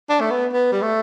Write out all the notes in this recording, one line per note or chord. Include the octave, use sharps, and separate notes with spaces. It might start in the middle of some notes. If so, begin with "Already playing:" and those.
D4
A3
B3
B3
G3
A3